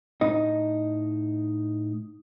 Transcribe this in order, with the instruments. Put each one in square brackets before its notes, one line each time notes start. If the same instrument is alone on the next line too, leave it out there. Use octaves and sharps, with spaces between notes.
[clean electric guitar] A2 D#4 D#5